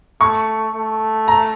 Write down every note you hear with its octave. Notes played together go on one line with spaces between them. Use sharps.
A3 C#6
A3
A#5